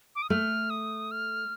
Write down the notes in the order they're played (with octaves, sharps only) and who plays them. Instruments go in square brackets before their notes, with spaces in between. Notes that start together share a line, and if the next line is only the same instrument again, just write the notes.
[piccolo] D6
D#6
[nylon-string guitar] A3 [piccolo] F6
[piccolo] D#6
F6